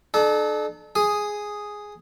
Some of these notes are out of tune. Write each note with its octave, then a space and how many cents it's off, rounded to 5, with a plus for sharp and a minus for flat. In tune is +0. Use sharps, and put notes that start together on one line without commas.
D4 +40 A4 -35
G#4 +0 D#6 +0